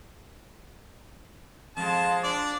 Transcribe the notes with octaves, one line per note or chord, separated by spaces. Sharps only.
F2 G#3 A5
D4 D5